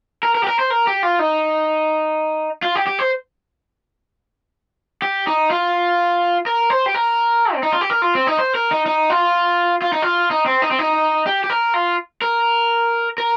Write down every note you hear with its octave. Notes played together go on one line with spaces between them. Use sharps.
A#4
A#4
G4
A#4
C5
A#4
G4
F4
D#4
F4
G4
G4
C5
G4
D#4
F4
A#4
C5
G4
A#4
C4
D#4
F4
G4
A#4
F4
C4
D#4
C5
A#4
D#4
D#4
F4
F4
D#4
F4
D#4
C4
D#4
C4
D#4
G4
G4
A#4
F4
A#4
A#4